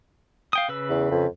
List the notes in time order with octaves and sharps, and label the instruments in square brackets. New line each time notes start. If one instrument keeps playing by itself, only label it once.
[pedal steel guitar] F5 G5 D#6
C#3 B4 E6
[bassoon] E2
F2